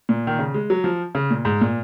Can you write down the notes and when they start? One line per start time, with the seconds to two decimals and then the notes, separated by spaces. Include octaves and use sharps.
0.09 A#2
0.27 D#3
0.39 C#3
0.54 G#3
0.70 F#3
0.84 F3
1.15 C#3
1.31 A#2
1.45 G#2
1.61 A#2